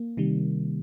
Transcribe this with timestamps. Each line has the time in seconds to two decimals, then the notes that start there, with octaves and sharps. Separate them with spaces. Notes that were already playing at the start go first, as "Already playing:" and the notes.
Already playing: A#3
0.17 C3 D#3 G3